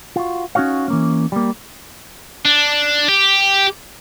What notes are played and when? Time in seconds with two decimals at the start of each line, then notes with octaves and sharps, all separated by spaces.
0.16 F4 F#4
0.55 C#4 D#4 F#4 C#5 F5
0.88 E3 A#3 C#4
1.32 G3 A#3
2.45 D4
3.08 G4